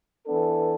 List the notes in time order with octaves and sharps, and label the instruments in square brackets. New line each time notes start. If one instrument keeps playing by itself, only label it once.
[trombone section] E3 B3 D4 A4